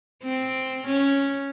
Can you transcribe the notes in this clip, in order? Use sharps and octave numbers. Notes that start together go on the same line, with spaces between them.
C4
C#4